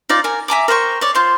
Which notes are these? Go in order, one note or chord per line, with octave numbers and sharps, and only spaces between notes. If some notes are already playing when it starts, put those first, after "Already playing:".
D#4 F4 D5
A#4 G#5
E5 G#5 A#5 D6
A#4 C5 G5 C#6
C#5 D5
F4 C5 C6